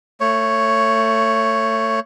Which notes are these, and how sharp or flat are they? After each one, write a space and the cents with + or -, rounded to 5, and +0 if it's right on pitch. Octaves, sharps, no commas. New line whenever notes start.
A3 +30 C#5 +0